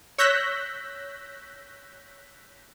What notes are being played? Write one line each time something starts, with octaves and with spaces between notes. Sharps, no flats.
C#5 E6 F#6 G6 A#6 B6